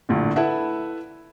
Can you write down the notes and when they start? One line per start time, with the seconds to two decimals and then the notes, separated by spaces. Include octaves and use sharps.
0.09 A#1 A2 D3
0.36 E4 A4 B4 E5 F#5